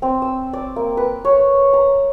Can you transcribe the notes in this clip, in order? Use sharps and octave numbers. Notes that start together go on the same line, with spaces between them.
C4
E6
D5
A#3
B4
C#5
A#5